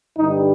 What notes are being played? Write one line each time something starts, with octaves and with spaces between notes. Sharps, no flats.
G2 D3 G3 D#4